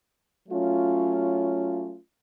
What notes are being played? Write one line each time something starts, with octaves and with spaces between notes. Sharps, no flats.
F#3 A3 C#4 F4